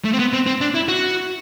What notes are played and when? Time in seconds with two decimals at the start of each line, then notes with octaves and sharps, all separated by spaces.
0.05 A3
0.13 C4
0.19 B3
0.33 C4
0.46 C4
0.61 D4
0.75 E4
0.88 F#4